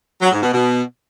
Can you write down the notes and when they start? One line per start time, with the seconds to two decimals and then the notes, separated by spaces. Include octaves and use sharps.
0.21 F#3
0.32 G#2
0.42 B2
0.53 B2